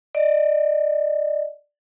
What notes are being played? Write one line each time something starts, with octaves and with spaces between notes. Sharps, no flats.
D5 D#5